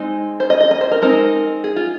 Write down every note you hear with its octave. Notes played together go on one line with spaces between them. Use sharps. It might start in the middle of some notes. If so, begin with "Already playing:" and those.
Already playing: G#3 C4 D#4
C5
D#5
D#5
D#5
C5
A#4
G#3 C4 D#4 A#4
G#4
F4